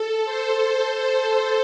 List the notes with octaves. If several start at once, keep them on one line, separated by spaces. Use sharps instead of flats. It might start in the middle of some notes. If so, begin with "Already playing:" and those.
Already playing: A4
C5